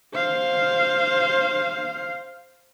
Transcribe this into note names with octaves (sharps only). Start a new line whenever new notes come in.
C5 F5